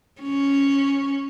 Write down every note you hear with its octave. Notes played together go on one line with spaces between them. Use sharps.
C#4